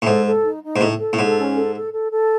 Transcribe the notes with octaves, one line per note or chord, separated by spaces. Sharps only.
A2
G#2 A4
A4
D#4
D#4
G#2
A2 A4
A4
A2
G#2 A4
C#4
A4
A4
A4
A4